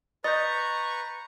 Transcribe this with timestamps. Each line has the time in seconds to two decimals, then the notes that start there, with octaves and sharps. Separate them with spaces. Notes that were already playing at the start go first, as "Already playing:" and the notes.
0.24 B4 D#5 A#5 C#6 G6 A6